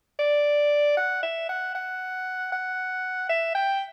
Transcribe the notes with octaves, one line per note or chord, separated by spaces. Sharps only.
D5
F#5
E5
F#5
F#5
F#5
E5
G5